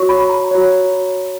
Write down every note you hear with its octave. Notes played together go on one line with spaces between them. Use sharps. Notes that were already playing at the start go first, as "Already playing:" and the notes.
Already playing: F#4 C#5 C#6
B5
A#5
F#4 C#5